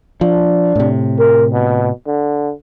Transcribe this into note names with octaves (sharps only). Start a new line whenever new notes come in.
F3 D4
A2 C3
A#4
B2
D3